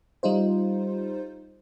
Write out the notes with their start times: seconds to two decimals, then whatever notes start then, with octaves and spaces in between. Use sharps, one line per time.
0.23 G3 D#4 F4 C5